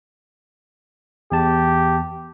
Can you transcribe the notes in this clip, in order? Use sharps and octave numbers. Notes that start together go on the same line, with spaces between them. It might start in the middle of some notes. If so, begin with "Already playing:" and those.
E2 G4 A5